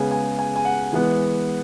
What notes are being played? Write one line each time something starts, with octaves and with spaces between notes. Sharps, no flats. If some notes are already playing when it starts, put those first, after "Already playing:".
Already playing: C#3 G#3 B3 G#5
G#5
G#5
G#5
F#5
E3 G#3 B3